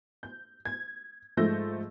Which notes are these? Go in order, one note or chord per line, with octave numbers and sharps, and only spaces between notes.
G6
G#6
G#2 F3 A3 E6 G6 A#6